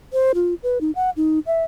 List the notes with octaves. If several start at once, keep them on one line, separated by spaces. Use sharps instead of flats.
C5
F4
B4
D#4
F#5
D#4
E5